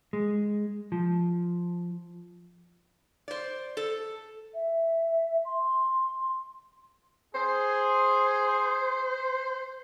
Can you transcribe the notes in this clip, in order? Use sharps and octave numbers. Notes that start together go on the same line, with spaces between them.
G#3
F3
C5 D5
A4
E5
C6
G#4 C5